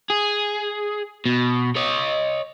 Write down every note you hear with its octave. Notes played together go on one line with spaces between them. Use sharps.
G#4
B2
C#5 D#5